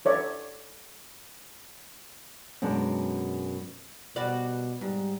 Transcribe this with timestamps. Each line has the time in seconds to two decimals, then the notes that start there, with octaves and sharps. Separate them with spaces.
0.05 A4 C#5 D5 E5
2.62 F#2 B2 G#3 D4
4.16 B2 G3 F#4 D5
4.81 G#2 G3